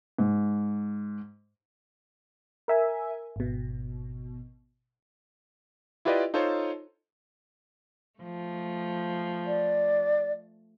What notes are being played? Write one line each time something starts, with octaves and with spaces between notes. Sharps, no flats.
G#2
A#4 E5 G#5
G#1 B2
E4 F4 G4 B4 D5 D#5
D#4 F4 A4 C5 C#5
F3 A3
D5